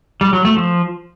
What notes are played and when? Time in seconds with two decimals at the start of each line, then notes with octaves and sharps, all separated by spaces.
0.21 G3
0.33 F#3
0.45 A3
0.57 F3